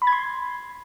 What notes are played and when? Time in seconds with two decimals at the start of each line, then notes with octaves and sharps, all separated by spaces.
0.02 B5
0.07 G#6
0.12 C6